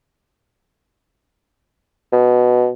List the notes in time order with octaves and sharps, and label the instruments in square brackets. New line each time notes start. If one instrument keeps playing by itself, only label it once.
[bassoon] B2